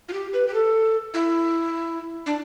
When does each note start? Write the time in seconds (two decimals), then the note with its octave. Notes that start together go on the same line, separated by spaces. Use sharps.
0.09 F4
0.13 G4
0.34 B4
0.48 G4
0.54 A4
1.14 E4
2.26 D4